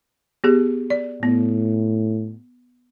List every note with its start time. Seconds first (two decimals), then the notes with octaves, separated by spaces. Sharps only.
0.44 B3 G4 G#4
0.90 D5
1.23 A2 B3